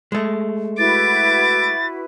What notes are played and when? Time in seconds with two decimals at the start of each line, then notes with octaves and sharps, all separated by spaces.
0.12 G#3 A3
0.78 E4 F#4 B4 D6 A6